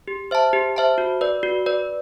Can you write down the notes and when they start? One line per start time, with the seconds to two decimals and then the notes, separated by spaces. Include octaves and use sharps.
0.08 G4
0.31 C5 E5 A5
0.53 G4
0.76 C5 E5 A5
0.98 F#4
1.21 B4 D5
1.43 F#4
1.66 B4 D5